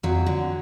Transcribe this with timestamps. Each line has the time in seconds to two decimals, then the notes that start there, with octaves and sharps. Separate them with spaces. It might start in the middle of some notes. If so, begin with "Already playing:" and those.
0.03 F2 F#3
0.26 D3